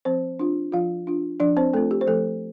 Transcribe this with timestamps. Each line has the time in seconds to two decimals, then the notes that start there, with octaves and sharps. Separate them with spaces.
0.05 F3 C4 C5
0.39 D4 F4
0.72 F3 F4 F5
1.07 D4 F4
1.40 F3 D4 D5
1.57 C4 C5
1.73 A3 C4 F4 A4
1.91 G4
2.01 C5
2.07 F3 A3 A4